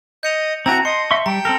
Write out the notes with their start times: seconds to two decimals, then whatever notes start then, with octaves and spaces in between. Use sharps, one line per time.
0.23 D#5 G6 C#7 F7
0.66 C4 E4 F#4 A5 A#5
0.85 D#5 C6 C#7
1.11 E5 C6 C#6
1.26 G3 G5 A#5
1.45 C4 A4 A#4 A#5